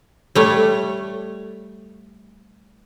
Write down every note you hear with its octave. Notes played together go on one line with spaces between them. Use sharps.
G3 A3 C#5